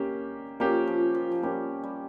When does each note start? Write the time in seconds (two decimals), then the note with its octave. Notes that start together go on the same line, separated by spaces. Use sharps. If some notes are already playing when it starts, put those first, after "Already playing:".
Already playing: D#3 A#3 C#4 G4
0.60 F3 A#3 C#4 G4
0.87 F3
1.15 F3
1.32 F3
1.43 G3 A#3 C#4 G4
1.84 G3